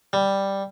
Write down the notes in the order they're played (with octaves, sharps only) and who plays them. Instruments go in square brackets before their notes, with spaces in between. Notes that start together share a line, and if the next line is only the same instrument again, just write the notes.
[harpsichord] G3